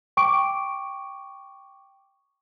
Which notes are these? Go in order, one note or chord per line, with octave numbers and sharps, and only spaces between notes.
G5 C#6 D6 D7